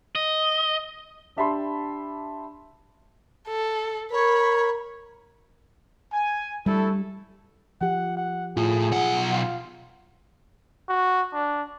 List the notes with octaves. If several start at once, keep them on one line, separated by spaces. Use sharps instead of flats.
D#5
D4 G4 E5 A5 B5 C6
A4
A#4 C#5 B5
G#5
G3 A3 E4 A4
F3 G4 F#5
F#5
A2 F4 G#4
B1 F#5
F4
F#4
D4